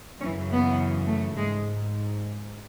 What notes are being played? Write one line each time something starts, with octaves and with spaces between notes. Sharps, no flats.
F#2 C#3 E3 C#4
B3
A3
G#2 G#3